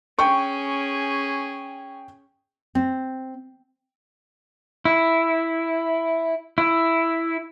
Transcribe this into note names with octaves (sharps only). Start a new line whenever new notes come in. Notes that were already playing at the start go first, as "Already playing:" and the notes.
C#4 G#4 G5 C#6
C4
E4
E4